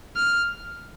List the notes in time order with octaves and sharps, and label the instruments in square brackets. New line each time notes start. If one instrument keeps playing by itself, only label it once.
[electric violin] F6